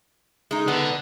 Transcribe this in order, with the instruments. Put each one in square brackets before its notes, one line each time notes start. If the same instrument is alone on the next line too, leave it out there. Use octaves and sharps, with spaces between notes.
[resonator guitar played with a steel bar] G#3 D#4
[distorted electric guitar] D3 [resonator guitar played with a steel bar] B3